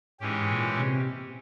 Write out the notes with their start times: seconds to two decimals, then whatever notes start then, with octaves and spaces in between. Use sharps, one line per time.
0.20 G#2 E3 G#3 C#4 G4
0.49 A#2
0.71 A#2
0.79 C3